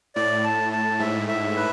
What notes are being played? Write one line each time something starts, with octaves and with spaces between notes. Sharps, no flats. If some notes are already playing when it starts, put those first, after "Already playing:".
A2 D5
A5
A5
G#2 E5
E5
B4